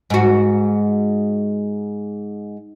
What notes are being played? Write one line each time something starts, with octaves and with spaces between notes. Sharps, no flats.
G#2 F#4